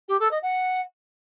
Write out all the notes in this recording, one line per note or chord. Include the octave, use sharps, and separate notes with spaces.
G4
A4
D#5
F#5